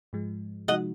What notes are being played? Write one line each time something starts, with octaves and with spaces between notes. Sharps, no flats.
G#2 F3 G#3
C3 F3 G#3 D#4 F#4 D#5 F#5